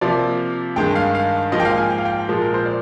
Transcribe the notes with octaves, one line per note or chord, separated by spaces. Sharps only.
C3 F3 A#3 D5
G2 D#3 G#3 G5
F5
F5
G#2 F3 A#3 D#5
G5
F5
G#5
G5
F5
G5
A#2 F3 G#3
A#4
C5
D5